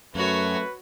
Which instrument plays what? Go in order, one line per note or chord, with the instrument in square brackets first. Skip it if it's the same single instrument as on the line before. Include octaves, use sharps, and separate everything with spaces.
[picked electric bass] F#2 [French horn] A3 [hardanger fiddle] F#4 C#5 [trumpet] B4